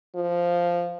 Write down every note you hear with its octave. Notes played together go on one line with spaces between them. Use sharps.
F3